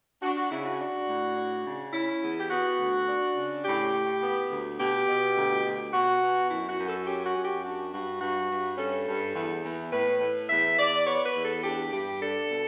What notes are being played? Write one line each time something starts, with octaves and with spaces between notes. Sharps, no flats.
D4 F#4
F#4
C#3 E4
F#4
D4
A2
D4
C#3
C#4 E4
E2
G4
B3 F#4
D2
D4
C#3
A2 G4
A2
B3
D2
B2 G4
B2
D2
D2
B2 F#4
B2
F#2 E4
F#4
F#2
A4
C#4 G4
F#4
F#2
G4
D4 F#4
G2 F#4
G2 F#4
G2
C#4 A4
G2
E2
E2
A2 B4
A2
E2 E5
E2 D5
B3 C#5
B4
E2
A4
D4 G4
G2 G4
D4 A4
B2